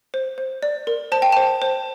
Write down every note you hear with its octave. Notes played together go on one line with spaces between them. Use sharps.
C5
C5
D5
A#4
C5 A5
G5
C5 A5
C5